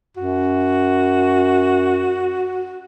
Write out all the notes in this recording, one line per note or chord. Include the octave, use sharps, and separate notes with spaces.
F#2 F#4